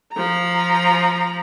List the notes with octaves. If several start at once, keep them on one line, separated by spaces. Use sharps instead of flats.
F3 A#5